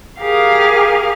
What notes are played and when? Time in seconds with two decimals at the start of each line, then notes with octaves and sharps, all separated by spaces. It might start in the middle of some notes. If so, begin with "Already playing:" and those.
0.22 G4 G#4 A#4 F5